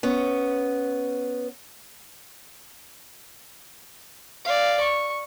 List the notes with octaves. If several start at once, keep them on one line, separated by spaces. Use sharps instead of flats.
B3 C#4
D5 F5
C#6